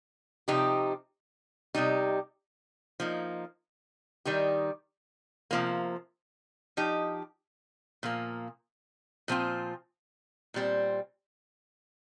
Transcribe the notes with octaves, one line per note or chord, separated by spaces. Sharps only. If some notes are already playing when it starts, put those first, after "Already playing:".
C3 F3 C4 D#4 G4
C3 G3 D#4 G4
F3 A#3 D#4
D#3 G3 D#4 G4
C3 F3 A#3
F3 D#4 G4
A#2 F3 A#3
A#2 F3 C4 F4
A#2 G3 C4